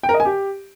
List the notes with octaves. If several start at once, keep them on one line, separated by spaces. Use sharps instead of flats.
G5
A#4
D#5
G#5
G4